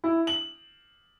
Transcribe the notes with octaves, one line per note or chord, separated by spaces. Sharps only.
E4
F#7